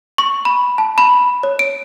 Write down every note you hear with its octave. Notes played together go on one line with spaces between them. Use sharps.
C#6
B5
A5
B5
C#5
D7